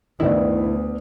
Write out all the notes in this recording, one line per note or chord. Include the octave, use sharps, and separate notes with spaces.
D2 G2 D#3 B3 E4 D5 D#5